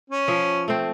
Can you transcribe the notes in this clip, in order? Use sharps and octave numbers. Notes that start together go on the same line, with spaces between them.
C#4
F3 E5
A3 C4